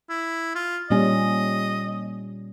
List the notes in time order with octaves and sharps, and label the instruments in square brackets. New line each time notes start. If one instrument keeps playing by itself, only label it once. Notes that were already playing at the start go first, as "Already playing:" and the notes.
[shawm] E4
F4
[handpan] A#2 G3 C#4 [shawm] D#5